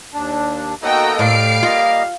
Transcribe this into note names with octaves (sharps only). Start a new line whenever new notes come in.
D#2 D4
A#3 B3 D#4 F#4 A4 D#5 G5 A#5
A2 G3 F5 C7 D7
A#3 F4 D#5